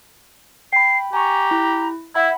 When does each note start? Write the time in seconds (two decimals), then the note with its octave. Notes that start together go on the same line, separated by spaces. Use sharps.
0.73 G5 B5 C7
1.13 G4 G#5 A#5 C#6
1.51 E4
2.15 E4 E5 F#5 B5